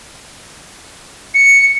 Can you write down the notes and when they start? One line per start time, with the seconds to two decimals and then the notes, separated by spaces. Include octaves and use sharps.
1.35 C#7